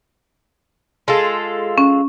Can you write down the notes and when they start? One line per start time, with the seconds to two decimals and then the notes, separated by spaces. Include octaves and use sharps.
1.08 G#3 F4 A4
1.78 C#4